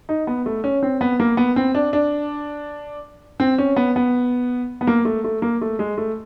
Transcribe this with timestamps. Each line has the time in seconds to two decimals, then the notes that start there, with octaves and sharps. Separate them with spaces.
0.09 D#4
0.27 B3
0.46 A3
0.64 C#4
0.83 C4
1.01 B3
1.20 A#3
1.37 B3
1.56 C4
1.75 D4
1.93 D4
3.40 C4
3.58 C#4
3.76 B3
3.96 B3
4.81 B3
4.87 A#3
5.05 A3
5.24 A3
5.42 A#3
5.62 A3
5.79 G#3
5.98 A3